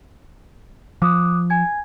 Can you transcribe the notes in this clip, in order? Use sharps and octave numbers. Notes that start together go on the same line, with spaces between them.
F3 D6 D#6 F#6
G#5 G#6